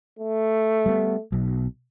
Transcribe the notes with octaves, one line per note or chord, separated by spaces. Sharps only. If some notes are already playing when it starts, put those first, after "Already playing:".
A3
G3 B3
B1 B2